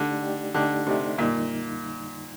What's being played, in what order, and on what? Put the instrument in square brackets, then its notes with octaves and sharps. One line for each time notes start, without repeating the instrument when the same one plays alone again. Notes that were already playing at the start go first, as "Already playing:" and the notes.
Already playing: [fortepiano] D3 [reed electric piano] A3 D#4 G4 D5
[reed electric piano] A3 D#4 G4 D5
[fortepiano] D3 [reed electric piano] A3 D#4 G4 D5
[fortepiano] C3 [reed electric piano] A3 D#4 G4 D5
[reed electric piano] F2 D3 G3 A#3 D#4 [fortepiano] A#2